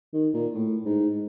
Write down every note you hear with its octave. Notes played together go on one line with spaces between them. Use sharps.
D#3
A#2
A2
G#2